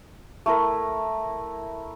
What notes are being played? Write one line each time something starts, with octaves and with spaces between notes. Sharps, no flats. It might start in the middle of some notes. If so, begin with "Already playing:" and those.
A3 E4 A#4